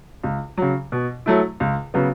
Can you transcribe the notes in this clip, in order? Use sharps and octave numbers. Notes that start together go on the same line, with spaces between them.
C#2
C#3 F#3
B2
F#3 A3 E4
C#2
C#3 F#3 B3